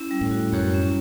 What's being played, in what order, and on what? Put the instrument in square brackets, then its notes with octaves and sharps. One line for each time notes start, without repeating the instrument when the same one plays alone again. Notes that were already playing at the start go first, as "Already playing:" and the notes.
Already playing: [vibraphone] C#4 E4
G3
[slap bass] A2
[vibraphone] F#4
[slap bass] F#2 [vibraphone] C#5
[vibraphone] C#4